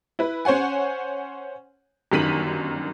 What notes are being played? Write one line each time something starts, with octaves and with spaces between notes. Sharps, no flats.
E4 B4
C#4 C5 C#5 F#5 G#5
G1 F#2 D#3 B6 D#7 F#7